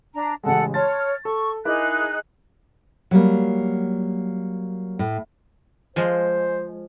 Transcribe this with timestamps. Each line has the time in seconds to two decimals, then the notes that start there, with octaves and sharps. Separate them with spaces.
0.13 D4 A#5
0.43 A1 C#3 G#3 A4 F#5
0.74 C#5 A5 C6 F6 A6
1.25 A4 C#6
1.65 D#4 E4 G#4 A#4 D6 F#6
3.11 F#3 G3 A#3
4.99 A2
5.96 F3 G#3 C5